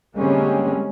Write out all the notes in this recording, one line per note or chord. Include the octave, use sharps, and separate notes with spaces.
D3 G3 G#3 A#3 C4 C#4